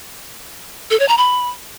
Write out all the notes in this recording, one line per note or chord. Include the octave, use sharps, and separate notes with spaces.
A4
C#5
A#5
B5